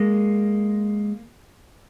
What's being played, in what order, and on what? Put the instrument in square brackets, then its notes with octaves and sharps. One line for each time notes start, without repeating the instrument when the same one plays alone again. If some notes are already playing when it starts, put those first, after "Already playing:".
Already playing: [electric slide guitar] G#3 A#3